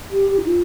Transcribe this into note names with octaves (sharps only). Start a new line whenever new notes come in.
G4
G4
D#4
F4